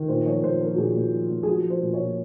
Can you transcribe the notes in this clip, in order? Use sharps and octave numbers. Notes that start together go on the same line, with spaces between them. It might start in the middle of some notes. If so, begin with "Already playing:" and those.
Already playing: D#3
A#2 C5
F3 C#5
A#2 C5
F3 A#4
F#4
A#2 G#4
A#2
F3
A#2
G#4
F3 F#4
F3
C5
A#2
C#5
A#2